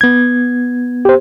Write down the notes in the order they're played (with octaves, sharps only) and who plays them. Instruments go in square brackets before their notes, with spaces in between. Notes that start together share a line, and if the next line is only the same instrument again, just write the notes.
[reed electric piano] B3 G#6
[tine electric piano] G4 C5